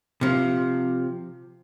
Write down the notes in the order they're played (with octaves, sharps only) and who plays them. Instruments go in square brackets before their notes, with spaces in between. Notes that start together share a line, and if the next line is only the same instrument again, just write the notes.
[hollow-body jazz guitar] C3 F3